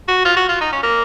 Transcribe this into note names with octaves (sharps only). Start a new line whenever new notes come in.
F#4
F4
F#4
F4
D#4
C#4
A#3